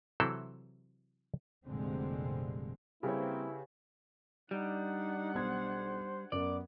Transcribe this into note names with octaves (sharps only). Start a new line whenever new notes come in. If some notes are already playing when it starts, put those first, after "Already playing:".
C3 E3 F#3 C4 E4 A4
F1 A#2 D3 G3 G#3 C4
C#3 G3 A#3 C4 E4 G4 B4 C#5
G3 D4 D#4 F#5
B1 C5 D#6 G#6
F#2 B3 A#4 D5